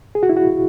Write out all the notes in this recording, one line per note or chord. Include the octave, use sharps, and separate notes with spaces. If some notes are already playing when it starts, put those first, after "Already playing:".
G#4
F#4
E4
F#4